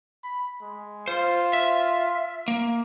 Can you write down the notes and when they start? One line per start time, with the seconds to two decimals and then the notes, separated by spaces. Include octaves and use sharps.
0.23 B5
0.61 G#3
1.08 F4 C5
1.53 E5
2.48 A#3